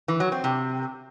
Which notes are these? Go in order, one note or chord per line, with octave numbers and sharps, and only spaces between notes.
E3
F#3
C4
C3